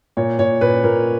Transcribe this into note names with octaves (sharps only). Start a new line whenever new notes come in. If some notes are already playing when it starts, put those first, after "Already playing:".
A#2 C#5
A#2 C#5
A#2 B4
A#2 A#4